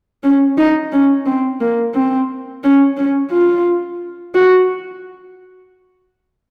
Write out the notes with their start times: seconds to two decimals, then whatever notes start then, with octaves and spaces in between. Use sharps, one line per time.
0.23 C#4
0.58 D#4
0.92 C#4
1.26 C4
1.60 A#3
1.94 C4
2.63 C#4
2.97 C#4
3.31 F4
4.35 F#4